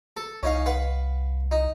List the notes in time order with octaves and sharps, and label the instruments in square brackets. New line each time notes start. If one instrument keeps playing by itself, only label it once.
[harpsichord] A4
[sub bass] C2 [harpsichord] C#4 D#4 F5
[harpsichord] B4 F5 F#5
D#4